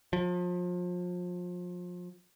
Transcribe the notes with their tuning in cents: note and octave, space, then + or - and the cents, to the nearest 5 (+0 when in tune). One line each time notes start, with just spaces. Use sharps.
F3 +30